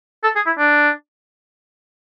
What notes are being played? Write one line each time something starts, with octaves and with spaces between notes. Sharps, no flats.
A4
G#4
E4
D4